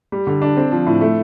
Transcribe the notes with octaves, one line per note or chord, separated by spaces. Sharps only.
G3
D3
D4
C4
F3
A2
A3